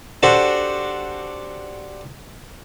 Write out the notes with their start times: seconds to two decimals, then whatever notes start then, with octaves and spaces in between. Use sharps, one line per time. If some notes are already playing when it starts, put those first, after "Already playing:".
0.23 D4 F#4 G4 A4 C5